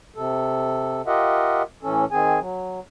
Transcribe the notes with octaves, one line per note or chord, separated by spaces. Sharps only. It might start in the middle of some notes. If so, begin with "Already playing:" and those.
C3 A4
F4 G4 A#4 D#5 E5 F#5
A2 E3 C#4 A4
D#3 C4 G#4 G#5
F#3